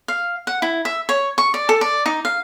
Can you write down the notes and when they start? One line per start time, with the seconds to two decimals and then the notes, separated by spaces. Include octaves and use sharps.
0.08 F5
0.47 F#5
0.62 E4
0.85 E5
1.09 C#5
1.38 C#6
1.54 D5
1.69 A4
1.81 D5
2.06 D#4
2.25 F5